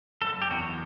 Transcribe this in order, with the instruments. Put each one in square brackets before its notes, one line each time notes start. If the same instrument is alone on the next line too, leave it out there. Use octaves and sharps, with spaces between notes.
[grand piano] F#1 [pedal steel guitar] A4
[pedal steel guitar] G4
[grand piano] E2 [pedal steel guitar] F#4